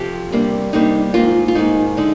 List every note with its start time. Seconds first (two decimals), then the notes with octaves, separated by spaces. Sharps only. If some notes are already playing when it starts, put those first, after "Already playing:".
Already playing: F2 C3 F3 G4
0.32 C3 G3 A#3 D4
0.73 C3 G3 A#3 D4 D#4
1.14 G#2 D#3 A#3 F4
1.48 F4
1.55 G#2 D#3 A#3 D#4
1.97 D3 G#3 D4 D#4